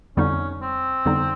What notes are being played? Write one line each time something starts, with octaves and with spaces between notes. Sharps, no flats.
F2 D3 G3 B3 C#4 D#4
C4
F2 D3 G3 B3 D#4